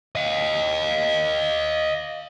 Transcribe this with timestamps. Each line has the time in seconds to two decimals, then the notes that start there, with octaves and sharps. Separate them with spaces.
0.15 D#5 F5